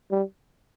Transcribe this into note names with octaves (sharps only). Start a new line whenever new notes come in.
G3